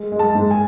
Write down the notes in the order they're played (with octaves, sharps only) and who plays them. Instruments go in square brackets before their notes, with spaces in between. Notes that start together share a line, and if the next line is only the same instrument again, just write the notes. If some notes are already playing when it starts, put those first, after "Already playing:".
Already playing: [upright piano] G#3
G#3
A5
G#2
G#5